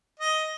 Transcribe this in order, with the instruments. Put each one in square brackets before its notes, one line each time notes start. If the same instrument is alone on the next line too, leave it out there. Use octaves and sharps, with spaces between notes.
[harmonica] D#5